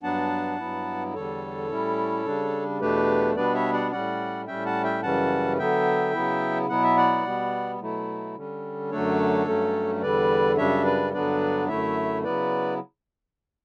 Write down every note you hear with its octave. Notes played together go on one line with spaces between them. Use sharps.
G2 F#3 B3 D4 F#5 A5
G2 F#3 B3 E4
E2 D3 G3 A4 C#5
A2 G3 C#4 E4
C#3 G3 D4
E2 B2 A3 D4 G4 B4
B2 G3 B3 D4 B4 D5
C#5 E5
D5 F#5
A2 G3 C#4 D5 F#5
A2 G3 C#4 E5 G5
F#5 A5
E5 G5
F#2 C#3 E3 G3 C#4 F#5 A5
D3 F#3 B3 E5 G5
C#3 F#3 B3 E4
B2 F#3 B3 E4 F#5
E5
D5 F#5
B2 G3 B3
B2 F#3 A3 E4
D3 G3 C#4
F#2 D3 F#3 A3 D4 A4 C#5
G2 F#3 A3 C#4
E2 D3 G3 B4 D5
F#2 C#3 G3 D4 C#5 E5
B4 D5
G2 D3 F#3 B3 D4 B4 D5
F#2 D3 A3 E4 C#5 E5
C#3 F#3 B3 E4 B4 D5